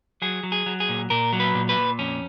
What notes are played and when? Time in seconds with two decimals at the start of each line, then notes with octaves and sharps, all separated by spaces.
0.22 F#3 G#4
0.43 F#3
0.52 G#4
0.66 F#3
0.80 G#4
0.89 A#2
1.10 A#2 A#4
1.33 F#3
1.40 B4
1.55 A#2
1.69 B4
1.76 A#2
1.99 F2 C#4